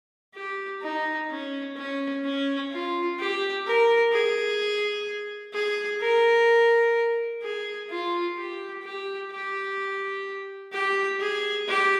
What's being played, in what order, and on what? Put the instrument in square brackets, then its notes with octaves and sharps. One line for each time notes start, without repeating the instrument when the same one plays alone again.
[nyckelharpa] G4
D#4
C#4
C#4
C#4
F4
G4
A#4
G#4
G#4
A#4
G#4
F4
G4
G4
G4
G4
G#4
G4